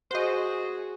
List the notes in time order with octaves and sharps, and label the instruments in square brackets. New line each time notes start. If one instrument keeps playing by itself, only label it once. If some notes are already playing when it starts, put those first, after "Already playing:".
[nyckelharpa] F#4 G#4 [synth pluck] C5 D#5